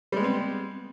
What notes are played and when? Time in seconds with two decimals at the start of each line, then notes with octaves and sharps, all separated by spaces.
0.12 G3
0.16 G#3
0.20 B3
0.24 C4